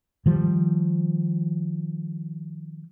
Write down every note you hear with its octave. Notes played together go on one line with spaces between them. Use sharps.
D#3 F3 G3